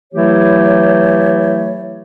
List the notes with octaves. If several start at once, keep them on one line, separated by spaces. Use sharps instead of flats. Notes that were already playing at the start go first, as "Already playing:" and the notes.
E3 F#3 A3 E4 G4 C#5